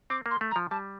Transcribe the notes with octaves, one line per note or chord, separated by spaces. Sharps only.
C4 D6
A#3
C6
A3
A#5
F3
G3 A5